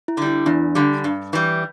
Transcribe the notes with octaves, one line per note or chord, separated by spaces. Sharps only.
E4
D3 G3
E4
E2 D4
D3 G3
G2
E3 G3